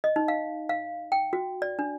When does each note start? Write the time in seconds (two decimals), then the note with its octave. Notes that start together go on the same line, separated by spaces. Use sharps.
0.04 D#5
0.16 D#4
0.28 F5
0.69 F5
1.12 G5
1.33 F#4
1.62 D5
1.79 D4